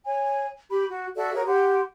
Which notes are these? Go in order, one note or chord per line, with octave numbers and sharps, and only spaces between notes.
C#5 G#5
G4 B5
F#4
F#4 A4 D5 E5
F#4 G#4 A#4 C#5
G4 F#5 C6